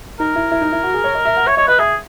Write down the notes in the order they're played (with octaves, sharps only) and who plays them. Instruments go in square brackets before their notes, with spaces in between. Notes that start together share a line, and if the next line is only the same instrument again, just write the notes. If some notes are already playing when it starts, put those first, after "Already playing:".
[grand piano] D#4 [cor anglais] A#4
[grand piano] E4
E4
D#4
E4
F#4
G#4
C#5
D#5
E5
F#5
[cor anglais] C#5 [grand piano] E5
[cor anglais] C#5 [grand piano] D#5
[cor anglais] B4 [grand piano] D#5
[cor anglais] G#4 [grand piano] E5